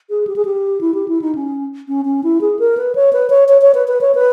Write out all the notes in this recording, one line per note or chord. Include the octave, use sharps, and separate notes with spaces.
G#4
G4
G#4
G4
E4
G4
E4
D#4
C#4
C#4
C#4
E4
G#4
A#4
B4
C#5
B4
C#5
C#5
C#5
B4
B4
C#5
B4